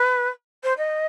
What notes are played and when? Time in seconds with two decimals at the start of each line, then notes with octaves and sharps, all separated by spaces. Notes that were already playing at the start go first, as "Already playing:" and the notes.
Already playing: B4
0.63 C5
0.77 D#5